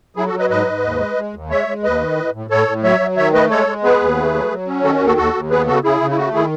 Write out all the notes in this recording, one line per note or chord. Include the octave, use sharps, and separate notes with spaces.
F#3 E4 G#4
F#4 A4
F#3
B4 D#5
G#2 B4 D#5
G#2
D#2
G#3
G#3
D#2
G#3 C#5 E5
G#3
D#2 B4 D#5
D#3
A2
A2
A2 A4 C#5
A2
F#3 C#5 E5
F#3
D#3 C#5 E5
A3 B4 D#5
G#3 A4 C#5
G#3
B3 G#4 B4
D#2
A3
F#3
F#3
C#4
D#3 F#4 A4
F#4
D#2
F#4 A4
D#2 F#4 A4
D#2
B3 G#4 B4
C#3 F#4 A4
C#3 E4 G#4
C#3
E4
A3 F#4
D#3 E4 G#4